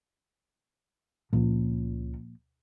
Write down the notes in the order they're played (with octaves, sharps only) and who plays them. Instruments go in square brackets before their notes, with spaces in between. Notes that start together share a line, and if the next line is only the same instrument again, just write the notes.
[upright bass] C#2 [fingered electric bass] A#2 F3